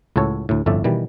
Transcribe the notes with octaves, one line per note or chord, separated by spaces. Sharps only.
C#2 A2 F#4 A4 C#5
D2 A2
G1 F2 A2 A3 D5 E5
B2 D#3 E3 G3